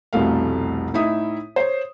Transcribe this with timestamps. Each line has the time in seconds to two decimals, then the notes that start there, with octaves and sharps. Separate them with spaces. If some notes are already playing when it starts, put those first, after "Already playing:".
0.13 F1 C2 B2 A3 F5
0.94 A2 D#4 E4 E5 D#6
1.56 C5 C#5